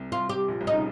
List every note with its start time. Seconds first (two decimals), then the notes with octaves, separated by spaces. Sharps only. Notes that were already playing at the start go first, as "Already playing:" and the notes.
Already playing: C2 C3
0.11 C2 C3 F4
0.29 G4
0.48 A#1 A#2
0.61 C2 C3
0.67 D#4
0.73 C#3